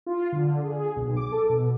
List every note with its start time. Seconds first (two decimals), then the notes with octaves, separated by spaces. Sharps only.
0.06 F4
0.32 D3
0.64 G#4
0.96 B1
1.17 D6
1.32 A4
1.49 B2